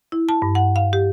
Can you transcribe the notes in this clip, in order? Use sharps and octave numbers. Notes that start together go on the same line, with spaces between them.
E4
A5
G2
F#5
F5
G4